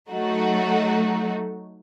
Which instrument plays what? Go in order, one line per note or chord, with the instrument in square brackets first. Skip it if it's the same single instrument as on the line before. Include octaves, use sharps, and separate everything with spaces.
[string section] F#3 A3 D#4 F#4